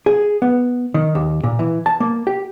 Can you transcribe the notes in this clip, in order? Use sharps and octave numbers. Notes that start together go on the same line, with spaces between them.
G#4
B3
D#3
D#2
A#2
E3
A5
A#3
G4